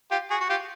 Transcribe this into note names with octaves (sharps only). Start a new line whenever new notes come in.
F4 G4
F#4 G#4
F#4
F4 G4